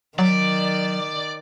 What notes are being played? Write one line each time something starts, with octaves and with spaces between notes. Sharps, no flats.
D#3 F#3 D5